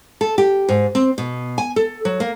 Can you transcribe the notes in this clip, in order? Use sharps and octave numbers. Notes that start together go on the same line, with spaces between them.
A4
G4
G#2
C4
B2
G#5
A4
F#3
A#3